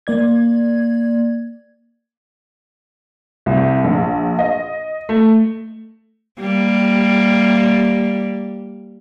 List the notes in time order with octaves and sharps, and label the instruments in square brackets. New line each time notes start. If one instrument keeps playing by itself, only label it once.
[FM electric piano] A#3 D5 G#6
[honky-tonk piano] C2
A#1
D#5
A3
[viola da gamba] G3 A#3